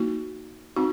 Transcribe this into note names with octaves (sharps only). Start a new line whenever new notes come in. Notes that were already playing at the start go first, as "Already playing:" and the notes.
Already playing: A#3 D#4 F#4
C4 D#4 F#4